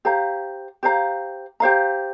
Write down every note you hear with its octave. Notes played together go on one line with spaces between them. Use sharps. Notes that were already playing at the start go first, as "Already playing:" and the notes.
G4 C5 F5 A#5
G4 C5 F5 A#5
G4 C5 F5 A#5